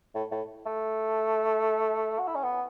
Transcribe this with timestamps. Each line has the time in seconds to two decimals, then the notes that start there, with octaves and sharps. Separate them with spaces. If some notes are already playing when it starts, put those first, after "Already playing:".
0.15 A2
0.31 A2
0.66 A3
2.19 F#4
2.27 E4
2.35 C#4
2.43 B3